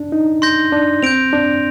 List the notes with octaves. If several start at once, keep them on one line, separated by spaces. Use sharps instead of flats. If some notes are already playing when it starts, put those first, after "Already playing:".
Already playing: D4
D#4
C6 G6 A#6
D4
C4 G6 D7 F7
D4